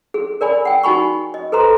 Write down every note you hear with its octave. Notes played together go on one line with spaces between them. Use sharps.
G#4
A#4 D5 G#5 B5
F#5 G5
D#4 F#4 G#5 B5 C#6
D#5
A4 B4 C5 A#5 C6